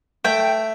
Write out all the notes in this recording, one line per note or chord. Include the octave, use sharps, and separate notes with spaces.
A3 G5